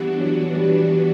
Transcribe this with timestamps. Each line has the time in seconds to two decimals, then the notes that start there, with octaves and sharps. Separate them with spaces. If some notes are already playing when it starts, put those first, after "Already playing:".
Already playing: E3 G3 B3 D4 F#4
0.20 F#3
0.55 G3
0.79 G3